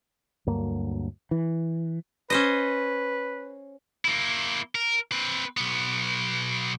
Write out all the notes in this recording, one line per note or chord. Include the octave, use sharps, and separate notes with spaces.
D2 G2 F#3 A#3
E3
C#4 B4 C5 D#5
A#3 E4
A#4
C4 B4
B1 B3